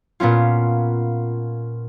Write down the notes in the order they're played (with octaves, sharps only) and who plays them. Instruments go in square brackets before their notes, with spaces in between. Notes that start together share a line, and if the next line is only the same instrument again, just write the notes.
[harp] A#2 B3 C#4 F4